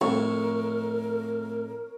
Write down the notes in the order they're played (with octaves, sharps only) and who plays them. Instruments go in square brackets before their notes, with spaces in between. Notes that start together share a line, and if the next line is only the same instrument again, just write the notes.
[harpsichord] F2 A2 [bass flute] A#4 [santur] C#6